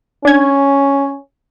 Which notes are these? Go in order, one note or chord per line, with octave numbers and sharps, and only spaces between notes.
C#4 D4 G#6